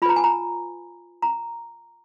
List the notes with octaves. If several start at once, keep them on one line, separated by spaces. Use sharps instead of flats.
F4 B4 A#5 B5
G#5
A#5
A#5